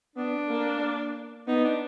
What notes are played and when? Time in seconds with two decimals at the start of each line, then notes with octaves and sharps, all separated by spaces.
0.16 B3 D4
0.49 A#3
1.48 B3 D#4
1.65 D4